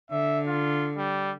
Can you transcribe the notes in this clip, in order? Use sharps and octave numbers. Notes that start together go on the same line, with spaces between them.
D3 E5
F4
G3